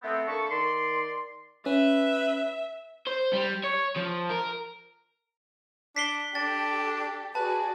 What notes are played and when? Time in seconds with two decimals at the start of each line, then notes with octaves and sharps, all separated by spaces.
0.03 A3 B3 C4
0.28 D3 A#3 A4 B5 C#6
0.50 D#3 D5 C6
1.66 C#4 B4 E5
3.07 C5
3.33 G3
3.64 C#5
3.96 F3
4.29 A#4
5.96 D4 B6 C7 G7
6.35 D4 G4 A4 A6
7.35 F#4 G#4 B4 D5 A5